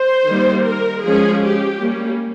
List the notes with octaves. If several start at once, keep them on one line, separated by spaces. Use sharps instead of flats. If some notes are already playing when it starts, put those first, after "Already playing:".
Already playing: C5
D#3 G3 A#3
A#4
F3 G#3 C#4 G#4
G4
G3 A#3 C#4